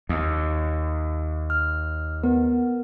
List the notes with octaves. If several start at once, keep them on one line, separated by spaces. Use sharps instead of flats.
D#2
F6
B3 A#4